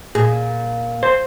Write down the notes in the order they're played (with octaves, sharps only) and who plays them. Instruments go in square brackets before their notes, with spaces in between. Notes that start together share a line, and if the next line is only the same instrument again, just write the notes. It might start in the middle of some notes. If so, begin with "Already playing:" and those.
[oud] A#2 [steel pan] G#4
[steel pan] C5